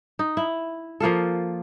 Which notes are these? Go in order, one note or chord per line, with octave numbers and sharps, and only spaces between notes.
D#4
E4
F3 A#3 F4 A4